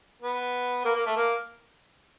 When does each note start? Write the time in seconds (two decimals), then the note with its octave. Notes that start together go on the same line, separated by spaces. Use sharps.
0.22 B3
0.85 A#3
0.95 A#3
1.06 A3
1.17 A#3